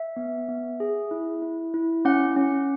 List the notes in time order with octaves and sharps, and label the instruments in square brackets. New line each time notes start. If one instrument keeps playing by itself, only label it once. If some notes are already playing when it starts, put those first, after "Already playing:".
Already playing: [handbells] E5
B3
B3
G#4
E4
E4
E4
C#4 F#5
C#4